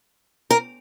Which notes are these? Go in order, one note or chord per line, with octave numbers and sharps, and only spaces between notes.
A#4